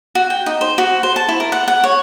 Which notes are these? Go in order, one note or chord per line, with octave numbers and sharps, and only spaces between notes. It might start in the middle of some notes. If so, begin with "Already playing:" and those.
F#4
G5
D#4
C5
F#4
C5
A5
E4
A#4
F#5
F#5
C#5